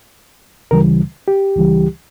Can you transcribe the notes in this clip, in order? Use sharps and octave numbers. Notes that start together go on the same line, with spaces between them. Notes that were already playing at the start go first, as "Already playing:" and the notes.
D2 C#3 E3 G3 A#4
G4
C#2 C#3 E3 G3